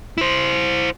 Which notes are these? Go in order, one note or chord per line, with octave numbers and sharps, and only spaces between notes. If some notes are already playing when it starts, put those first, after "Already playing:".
E4 C5